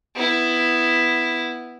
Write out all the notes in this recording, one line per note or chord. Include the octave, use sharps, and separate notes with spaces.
B3 E4